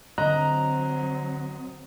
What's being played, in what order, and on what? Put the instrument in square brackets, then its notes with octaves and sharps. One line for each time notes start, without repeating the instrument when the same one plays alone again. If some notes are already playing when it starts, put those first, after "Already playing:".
[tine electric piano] D3 F#6 [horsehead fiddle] F#3 C4 [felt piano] D#5 [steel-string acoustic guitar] A#5